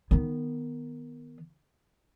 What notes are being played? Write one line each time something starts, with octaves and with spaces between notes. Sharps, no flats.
D#3 B3